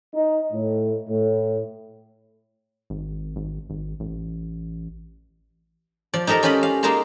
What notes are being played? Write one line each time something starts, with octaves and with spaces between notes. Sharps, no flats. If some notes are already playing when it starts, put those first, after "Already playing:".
D#4
A2
A2
G#1
G#1
G#1
A1
F3 D5
D#4 G4 A4 A#4 A#5
C#4 F4 G4 D5 D#5 B5
F5
G#3 A#3 D#4 A5 A#5 C6